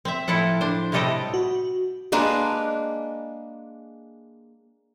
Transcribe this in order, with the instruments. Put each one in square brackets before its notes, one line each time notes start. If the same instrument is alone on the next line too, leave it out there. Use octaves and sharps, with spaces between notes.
[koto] C4 E5
A2 F3 E4 A4 F#5
D4 C5
A2 C3 G3 A4 D#5 G5
[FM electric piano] F#4
[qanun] G#3 A#3 D4 B4